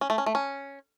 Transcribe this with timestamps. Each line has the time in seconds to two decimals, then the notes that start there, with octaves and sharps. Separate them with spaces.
0.01 C#4
0.10 A3
0.18 C#4
0.26 A3
0.35 C#4